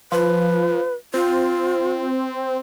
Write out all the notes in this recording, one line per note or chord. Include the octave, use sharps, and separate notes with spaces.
F3 B4
C4 F4